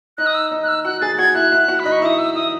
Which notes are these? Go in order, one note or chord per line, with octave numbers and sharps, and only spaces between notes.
D#4 D#5 F#6
D#6
E6
D#4 D#5
F#6
E6
F#4 F#5 F#6
G#4 G#5 A6
F#4 F#5 G#6
E4 E5 F#6
E4 E5
F#4 F#5
B5
D#4 D#5
C#6
E4 E5 D#6
E6
E4 E5 D#6